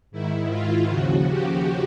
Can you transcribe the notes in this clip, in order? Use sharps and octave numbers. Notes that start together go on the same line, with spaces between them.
G#2 D#3 E4
F4
D#2 C#3 F3 F#4
G4